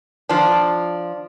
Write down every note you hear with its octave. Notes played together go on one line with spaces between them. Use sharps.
F3 D4